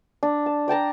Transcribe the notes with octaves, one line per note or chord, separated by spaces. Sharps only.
D4
A5
D5 G5 A5 A#5